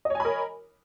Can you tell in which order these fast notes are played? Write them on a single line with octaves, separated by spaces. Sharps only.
D#5 C#5 G#5 B5 A#4